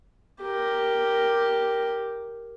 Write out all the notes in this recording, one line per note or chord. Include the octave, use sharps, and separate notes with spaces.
G4 A#4